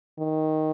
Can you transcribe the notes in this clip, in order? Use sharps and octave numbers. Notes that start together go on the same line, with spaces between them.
D#3